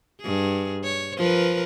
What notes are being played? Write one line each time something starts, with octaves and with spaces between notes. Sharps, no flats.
G2 G#4
C#5
F3 A#4 B4